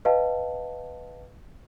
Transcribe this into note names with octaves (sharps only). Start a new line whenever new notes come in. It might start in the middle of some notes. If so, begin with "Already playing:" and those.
B4 D#5 F5 G5 A5